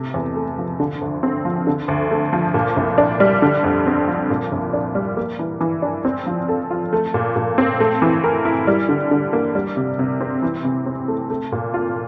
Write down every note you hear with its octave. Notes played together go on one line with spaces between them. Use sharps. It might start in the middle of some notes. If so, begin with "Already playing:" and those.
Already playing: C3 A3
E2
A3
F3
D3
D2
C4
F3
D3
D2
A3
F3
A#2
C2
D4
G3
D3
F2
C4
F3
A#2
C2
D4
G3
A#3
E3
E3
D4
C4
F3
A4
F4
A3
A#2
A#2
C4
A3
E3
A#4
E4
G3
D3
D3
A#3
G3
C3
C3
C4
E3
C3
C4
A3
A3
A#2
F4